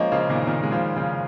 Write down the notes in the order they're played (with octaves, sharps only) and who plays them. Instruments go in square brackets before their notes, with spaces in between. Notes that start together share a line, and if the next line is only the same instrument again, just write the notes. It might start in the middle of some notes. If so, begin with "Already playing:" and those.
Already playing: [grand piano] F3 G#3 A#3 C#4 [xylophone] D#5
[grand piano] C#3 F3
A#2 D#3
A#2 D#3
G#3
C#3 F3
C#3 F3